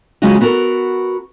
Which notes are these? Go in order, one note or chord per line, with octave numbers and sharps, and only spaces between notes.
C#3 F#3 G#3 C#4 F4 F#4
B3 F#4 A4 A#4